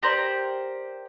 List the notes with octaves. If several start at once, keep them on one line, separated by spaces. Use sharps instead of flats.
G4 A#4 C5 D5